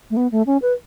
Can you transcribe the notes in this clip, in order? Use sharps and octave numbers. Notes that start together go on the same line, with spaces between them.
A3
B3
A3
C#4
B4